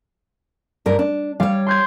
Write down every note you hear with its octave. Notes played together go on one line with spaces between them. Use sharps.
G2 A#4
D4
G3 C#5 F5
C6 G6 G#6